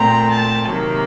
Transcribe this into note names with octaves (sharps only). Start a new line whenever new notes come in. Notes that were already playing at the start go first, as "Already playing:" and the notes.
Already playing: A#2 A3 C4 A#5
A5
C3 D#3 F#3 A#3